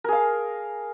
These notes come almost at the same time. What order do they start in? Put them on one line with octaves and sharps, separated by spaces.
A#4 G#4 F5